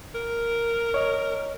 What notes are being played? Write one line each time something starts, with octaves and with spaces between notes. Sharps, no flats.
A#4
C#5 D#5